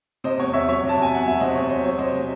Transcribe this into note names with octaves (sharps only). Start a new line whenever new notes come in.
C3 C5 D#5
E2 C#5
E2 C#5 E5
F#3 C#5 E5
C3
A5
E2 G#5
E2 F#5
F#3 E5
C3 C5 D#5
E2 C#5
E2 C5
F#3 C#5
C3 C5 D#5